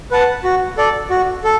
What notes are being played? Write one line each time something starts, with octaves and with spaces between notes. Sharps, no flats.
B4 F#5 A5
F#4
A4 D5
F#4
A4